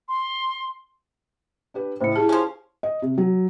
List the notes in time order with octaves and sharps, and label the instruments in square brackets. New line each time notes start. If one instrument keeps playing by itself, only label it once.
[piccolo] C6
[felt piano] D4 G4 B4
[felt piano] C#2 A2 [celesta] C5 C#7
[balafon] E4 G#4 [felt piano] G4 [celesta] A5
[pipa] F3 C#4
[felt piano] D#5
C3
F#3